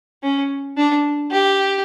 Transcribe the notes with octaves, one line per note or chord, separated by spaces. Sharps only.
C#4
D4
G4